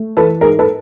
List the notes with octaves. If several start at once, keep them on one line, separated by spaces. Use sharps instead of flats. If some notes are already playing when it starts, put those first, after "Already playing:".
Already playing: A3
E3 A4 B4
G#2 G#4 A#4
A4 B4